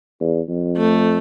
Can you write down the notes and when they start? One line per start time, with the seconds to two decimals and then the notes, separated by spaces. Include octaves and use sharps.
0.21 E2
0.49 F2
0.77 A3